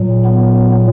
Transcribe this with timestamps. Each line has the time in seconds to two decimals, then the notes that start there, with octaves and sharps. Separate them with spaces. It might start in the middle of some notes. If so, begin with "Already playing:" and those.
Already playing: A#2 F#3
0.25 B3